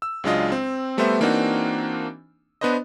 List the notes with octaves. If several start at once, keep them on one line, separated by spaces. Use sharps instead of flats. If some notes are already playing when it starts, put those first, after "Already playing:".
E6
C#2 F#3 G#3 D4 F4 D#5
C4
G3 A3 B3 G4 C5 E5
E3 A#3 C4 D4 D#4 F#4
B3 D4 B4 C5 D#5